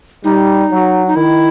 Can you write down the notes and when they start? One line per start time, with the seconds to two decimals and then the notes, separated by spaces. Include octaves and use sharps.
0.24 G3 D#4
0.71 F#3
1.07 D#4
1.16 D#3 E4